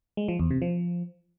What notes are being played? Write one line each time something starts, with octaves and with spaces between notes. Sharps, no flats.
G#3
F3
E2
C3
F3